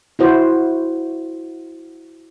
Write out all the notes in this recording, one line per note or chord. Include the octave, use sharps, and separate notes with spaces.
E4 F#4 C5